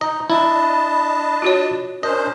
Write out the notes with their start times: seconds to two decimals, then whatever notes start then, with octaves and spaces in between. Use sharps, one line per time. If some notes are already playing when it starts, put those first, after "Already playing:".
0.01 D#4 D#5 A#5
0.30 D4 E4 D#5 A5 B5
1.42 F4 F#4 C#5
2.03 C#4 D4 A#4 C5 D#5